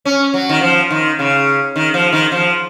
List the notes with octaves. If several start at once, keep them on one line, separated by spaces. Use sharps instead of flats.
C#4
F#3
D#3
F3
D#3
C#3
D#3
F3
D#3
F3